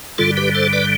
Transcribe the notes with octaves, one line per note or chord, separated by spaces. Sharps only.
G2 D3 G3 F4 A4
G4 B4
A4 C5
B4 D5